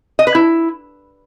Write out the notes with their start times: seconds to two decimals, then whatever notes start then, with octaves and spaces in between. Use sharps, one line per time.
0.19 D#5
0.27 B4
0.35 E4